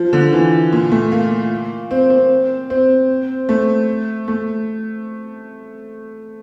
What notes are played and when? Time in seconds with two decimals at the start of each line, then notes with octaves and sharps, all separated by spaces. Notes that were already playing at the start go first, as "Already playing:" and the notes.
Already playing: F3
0.13 D3
0.33 E3
0.72 A#2
0.91 A3
1.12 A#3
1.91 C4
2.10 C4
2.70 C4
3.49 A3
4.28 A3